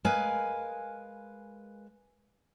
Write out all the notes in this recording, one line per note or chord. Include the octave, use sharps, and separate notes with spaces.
G#3 A#4 B4 F5 G#5